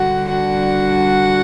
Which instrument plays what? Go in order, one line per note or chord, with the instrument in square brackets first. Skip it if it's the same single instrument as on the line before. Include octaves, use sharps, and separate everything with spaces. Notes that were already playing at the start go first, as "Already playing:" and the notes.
Already playing: [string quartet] D3 G3 D4 F#4 F#5
F#4 F#5